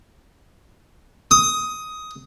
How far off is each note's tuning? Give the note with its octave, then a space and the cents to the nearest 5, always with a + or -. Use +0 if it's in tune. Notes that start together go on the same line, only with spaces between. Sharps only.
D#6 +15